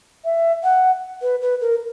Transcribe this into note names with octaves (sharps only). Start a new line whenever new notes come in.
E5
F#5
B4
B4
A#4